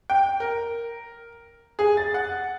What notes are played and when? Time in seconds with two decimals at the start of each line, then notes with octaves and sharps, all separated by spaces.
0.10 G5
0.40 A#4
1.79 G#4
1.97 A6
2.14 F#5